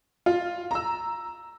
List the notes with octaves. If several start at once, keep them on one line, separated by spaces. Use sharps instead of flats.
F4
A#5 E6